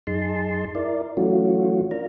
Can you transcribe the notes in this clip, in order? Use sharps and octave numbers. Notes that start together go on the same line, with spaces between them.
F#2 D#4 G#4 A5 C6
E4 A#4 D5
E3 F#3 A3 C#4 F4 F#4
D4 F4 A#4 A#5